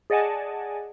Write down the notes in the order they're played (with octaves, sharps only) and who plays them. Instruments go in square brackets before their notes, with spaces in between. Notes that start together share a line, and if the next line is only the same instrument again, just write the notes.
[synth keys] G#4 D5 D#5 F#5 G#5 A5